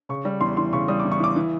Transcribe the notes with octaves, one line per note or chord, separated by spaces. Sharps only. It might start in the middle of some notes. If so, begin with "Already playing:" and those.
C#3 C#6
G3
E2 C6
E3 C6
C#3 C#6
G3 D#6
D6
E2
C#6
E3 D6
E3